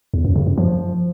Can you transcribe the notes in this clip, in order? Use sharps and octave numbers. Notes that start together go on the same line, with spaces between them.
E2
F#2
C#3
F#2
F3